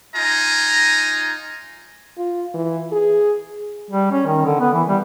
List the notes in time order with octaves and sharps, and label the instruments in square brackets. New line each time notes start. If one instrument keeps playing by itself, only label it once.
[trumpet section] D#4 F4 D#5 G#5 A#5
[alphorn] F4
E3
G#4
[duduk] G3
C#4
D#3
D3
B3
E3
G3